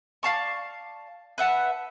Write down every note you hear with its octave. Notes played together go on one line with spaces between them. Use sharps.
D5 F5 A5 C#6
B4 E5 F#5 A5